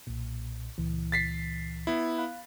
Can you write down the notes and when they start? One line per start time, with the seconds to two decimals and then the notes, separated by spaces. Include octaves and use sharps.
0.07 B1 A#2
0.78 C#2 A#2 E3
1.12 A6 B6 C7
1.87 B3 E4
2.18 F5 B5 F#6